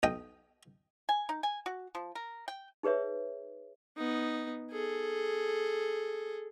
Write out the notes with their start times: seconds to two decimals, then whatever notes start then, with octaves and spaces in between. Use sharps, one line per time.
0.03 B1 D#5 G5 D#6
1.09 G#5
1.29 D#4
1.43 G#5
1.66 F#4
1.95 F3
2.15 A#4
2.48 G5
2.83 D#4 G#4 B4 C#5 E5
3.97 B3 D#4
4.72 G#4 A4